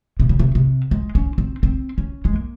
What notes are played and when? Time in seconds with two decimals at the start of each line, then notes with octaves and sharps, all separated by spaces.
0.20 C3
0.29 C#3
0.39 C3
0.55 C3
0.91 G#3
1.15 C#4
1.38 C4
1.63 C4
1.98 C#4
2.25 G#3
2.33 A#3